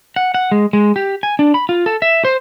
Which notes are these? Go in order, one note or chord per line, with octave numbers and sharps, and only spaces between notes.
F#5
F#5
G#3
G#3
G4
G#5
D4
B5
F4
A4
E5
C5